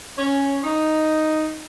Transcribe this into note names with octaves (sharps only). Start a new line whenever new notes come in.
C#4
D#4